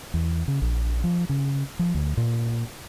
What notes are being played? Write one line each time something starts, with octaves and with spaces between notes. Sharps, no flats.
E2
C#3
A#1
F3
C#3
F3
D2
A#2